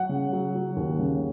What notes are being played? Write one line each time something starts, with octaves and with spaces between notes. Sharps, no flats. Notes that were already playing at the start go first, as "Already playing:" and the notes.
Already playing: F#3 F#5
C#3
F#3
F#3
D#2
C#3